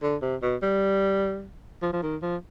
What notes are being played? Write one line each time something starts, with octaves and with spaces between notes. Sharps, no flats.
D3
C3
B2
G3
F3
F3
D#3
F3